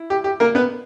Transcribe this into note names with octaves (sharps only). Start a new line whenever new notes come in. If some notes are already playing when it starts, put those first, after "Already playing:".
Already playing: E4
G4
G4
A#3 A#4
B3 B4